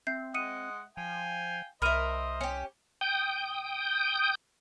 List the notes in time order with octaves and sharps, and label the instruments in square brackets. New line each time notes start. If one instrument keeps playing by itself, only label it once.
[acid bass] C4 [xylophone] E5 G6 C7
[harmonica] G#3 D#5 F#5 [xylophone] D#6 C#7 D#7
[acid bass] F3 [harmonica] F5 G5 G#5
[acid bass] C2 [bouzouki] A#4 E5 [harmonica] C5 D#5 [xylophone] B5 F6 D#7
[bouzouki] C#4 G4
[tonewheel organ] G5 D#6 G6